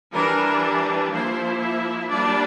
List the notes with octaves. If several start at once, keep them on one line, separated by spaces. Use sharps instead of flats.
E3 G3 D4 A#4
F3 A#3 E4 C5
E5
G3 A#3 D4 D5